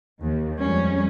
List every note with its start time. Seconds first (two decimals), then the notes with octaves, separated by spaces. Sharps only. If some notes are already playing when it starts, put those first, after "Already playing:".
0.22 D#2
0.62 F2 G3 G#3 C#4